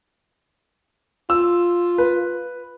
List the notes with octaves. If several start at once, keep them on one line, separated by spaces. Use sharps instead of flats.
F4 E6
B4